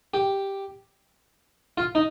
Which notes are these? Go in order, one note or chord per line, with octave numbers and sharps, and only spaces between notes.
G4
F4
D#4